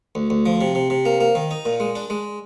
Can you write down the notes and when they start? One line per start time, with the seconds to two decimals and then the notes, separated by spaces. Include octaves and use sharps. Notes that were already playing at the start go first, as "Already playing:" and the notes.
0.15 D2
0.30 D2
0.46 F3
0.61 C3
0.75 C3
0.90 C3
1.05 A#3
1.20 A#3
1.35 D#3
1.51 D#4
1.65 A#2
1.80 G#3
1.95 D4
2.10 G#3